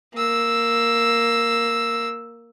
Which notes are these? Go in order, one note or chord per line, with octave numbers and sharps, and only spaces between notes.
A#3 E6